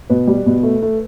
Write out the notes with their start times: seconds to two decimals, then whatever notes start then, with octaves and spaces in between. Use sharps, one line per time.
0.10 B2 B4
0.27 G3
0.46 B2
0.63 A3
0.82 A3